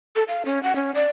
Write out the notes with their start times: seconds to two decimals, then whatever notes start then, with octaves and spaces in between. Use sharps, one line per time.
0.16 A4
0.28 F5
0.45 C#4
0.63 F#5
0.76 C#4
0.95 D5